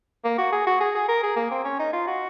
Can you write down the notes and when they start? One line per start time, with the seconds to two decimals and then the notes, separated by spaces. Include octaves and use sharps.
0.25 A#3
0.38 F#4
0.53 G#4
0.67 F#4
0.81 G#4
0.95 G#4
1.09 A#4
1.23 G#4
1.37 A#3
1.51 C4
1.65 C#4
1.79 D#4
1.93 F4
2.08 F#4